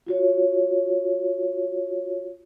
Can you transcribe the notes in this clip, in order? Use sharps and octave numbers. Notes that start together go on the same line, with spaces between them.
F4 F#4 C#5